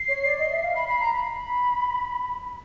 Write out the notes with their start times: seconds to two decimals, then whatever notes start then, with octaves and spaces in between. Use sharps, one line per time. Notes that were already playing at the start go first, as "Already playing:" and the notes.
Already playing: C7
0.08 C#5
0.25 D5
0.38 D#5
0.51 E5
0.63 F5
0.75 B5 C7
0.88 B5 C7
1.00 A#5
1.13 B5